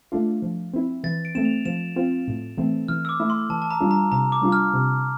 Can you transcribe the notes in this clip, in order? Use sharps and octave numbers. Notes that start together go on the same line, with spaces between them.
A3 D4 F4
F3
C4 E4
E3 A6
D7
A3 C4 E7
F7
F3 E7
C4 F4
A2
E3 A3 C4
E3 F6
E6
D6
A3 E4
C6
E3 A5
A5
A#5
G3 D4 F4
A#5
C3 A#5
D6
G3 D4 F4
F6
C3